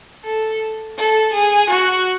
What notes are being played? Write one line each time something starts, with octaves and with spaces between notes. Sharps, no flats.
A4
A4
G#4
F#4